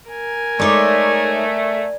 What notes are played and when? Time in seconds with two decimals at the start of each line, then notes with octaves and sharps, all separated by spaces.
0.10 A#4 G#5
0.60 G#3 A3 D#4 C#5 D5